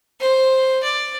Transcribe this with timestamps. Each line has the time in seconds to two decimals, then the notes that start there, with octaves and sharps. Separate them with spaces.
0.20 C5
0.83 D5